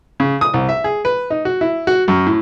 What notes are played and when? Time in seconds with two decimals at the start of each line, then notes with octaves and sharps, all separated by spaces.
0.20 C#3
0.41 D#6
0.54 C2
0.69 E5
0.84 G#4
1.05 B4
1.30 D#4
1.45 F#4
1.61 E4
1.87 F#4
2.08 F#2
2.26 A2